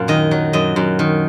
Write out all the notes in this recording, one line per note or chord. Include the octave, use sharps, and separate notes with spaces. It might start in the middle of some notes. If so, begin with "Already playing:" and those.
Already playing: F#2 A#2 F5
D#3 D#5
F#3
F#2 D#5
F#2
D#3